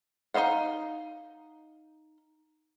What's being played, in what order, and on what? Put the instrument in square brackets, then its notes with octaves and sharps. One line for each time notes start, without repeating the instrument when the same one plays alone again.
[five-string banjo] D#4 C5 D#5 F5 F#5